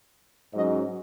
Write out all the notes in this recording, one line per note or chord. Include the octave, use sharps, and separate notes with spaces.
G#2 F#3 C#4 D#5